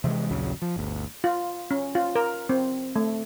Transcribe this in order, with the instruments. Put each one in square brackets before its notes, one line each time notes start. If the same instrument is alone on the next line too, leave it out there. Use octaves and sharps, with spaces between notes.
[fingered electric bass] C3 E3 F3 G#3
A#1 D#2 C#3 F#3
F3
G1 D2
[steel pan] F4
C#4
F4
A#4
C4
A3